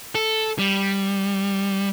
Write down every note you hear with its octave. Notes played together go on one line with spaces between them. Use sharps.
A4
G3